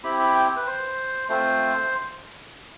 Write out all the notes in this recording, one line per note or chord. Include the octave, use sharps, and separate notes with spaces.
C4 E4 G4 B5
B5
G5
B4
C5
A3 C4 F4 C5